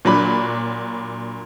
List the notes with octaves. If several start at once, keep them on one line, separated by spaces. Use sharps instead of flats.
A#2 F#3 D4 B5